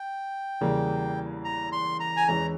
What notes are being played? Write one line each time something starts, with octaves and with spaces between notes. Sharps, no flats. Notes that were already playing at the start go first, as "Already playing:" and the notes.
Already playing: G5
E2 C#3 G3 A#3
A#5
C6
A#5
G#5
E2 E3 G#3 C#4 A#5